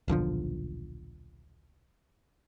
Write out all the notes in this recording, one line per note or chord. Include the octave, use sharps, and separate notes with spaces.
D#1 B1 D3 F3